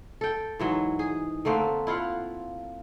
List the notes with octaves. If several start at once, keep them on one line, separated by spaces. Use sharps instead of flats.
A4 G5
G#2 E3 F#3
G#4
D3 A3 A#3 C4
E4 F4 F5 F#5